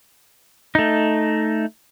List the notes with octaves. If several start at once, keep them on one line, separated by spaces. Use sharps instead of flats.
A3 D#4